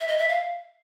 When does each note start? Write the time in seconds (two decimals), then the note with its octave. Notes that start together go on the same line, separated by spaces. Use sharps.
0.01 E5
0.08 D#5
0.18 E5
0.29 F5